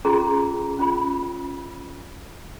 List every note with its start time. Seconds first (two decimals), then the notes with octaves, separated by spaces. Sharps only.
0.05 C#4 F4 G#4 A#5 C6
0.79 C#4 F4 B5